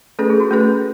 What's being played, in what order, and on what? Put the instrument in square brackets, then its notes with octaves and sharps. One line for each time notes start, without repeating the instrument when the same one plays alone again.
[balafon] A3 C#4 G#4 B4 [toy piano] A4
[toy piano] G#4
F#4
[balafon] A3 C#4 G#4 B4